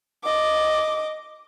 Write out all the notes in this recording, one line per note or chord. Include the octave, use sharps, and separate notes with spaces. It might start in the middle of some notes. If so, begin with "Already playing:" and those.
D#5 D6